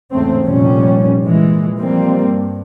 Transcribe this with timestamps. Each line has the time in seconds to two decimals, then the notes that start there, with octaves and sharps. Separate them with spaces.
0.12 E2 G#2 C#3 A3 C4
0.45 F1 G2 A#2 G3 C#4
1.25 A#2 E3 G#3
1.79 F2 G3 A#3 C4
2.27 G2